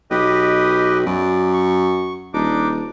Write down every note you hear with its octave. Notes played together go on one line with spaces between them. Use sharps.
B1 G4 B4 D#5
F#2 D5
C#6
D#1 D4 D#4 D6